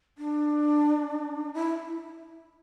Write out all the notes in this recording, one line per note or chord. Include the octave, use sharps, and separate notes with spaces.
D4
E4